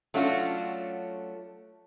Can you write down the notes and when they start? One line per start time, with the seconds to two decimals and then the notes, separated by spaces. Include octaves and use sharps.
0.14 F#3 A3 C#4 D4 F4 F#4